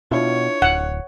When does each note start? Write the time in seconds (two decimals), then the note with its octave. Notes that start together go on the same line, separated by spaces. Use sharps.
0.11 B2 D4 E4 F4 C#5
0.62 D1 F#5